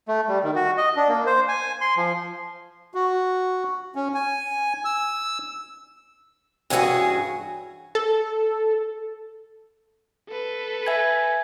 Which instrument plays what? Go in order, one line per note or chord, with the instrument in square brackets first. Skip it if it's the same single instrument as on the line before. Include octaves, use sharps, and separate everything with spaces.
[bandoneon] A3
G3
D#3
F#4
D#5
D4
A#3
C5
G#5
C6
F3
F#4
C#4
G#5
E6
[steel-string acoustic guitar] G2 E3 C#4 F4 F#4 G#4
[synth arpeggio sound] A4
[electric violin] A4 B4
[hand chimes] E5 G#5 G#6